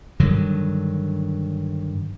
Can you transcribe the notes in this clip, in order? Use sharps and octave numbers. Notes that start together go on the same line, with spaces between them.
G2 D3 D#3 F#3